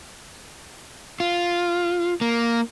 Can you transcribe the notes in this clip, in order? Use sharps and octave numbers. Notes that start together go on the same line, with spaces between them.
F4
A#3